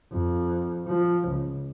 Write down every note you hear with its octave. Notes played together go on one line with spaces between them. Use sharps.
F2
F3
C#2